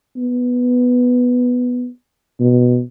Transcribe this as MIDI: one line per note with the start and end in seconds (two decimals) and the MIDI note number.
0.16 1.88 59
2.40 2.81 47